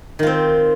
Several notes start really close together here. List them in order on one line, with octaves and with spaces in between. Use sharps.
D#3 F4 C4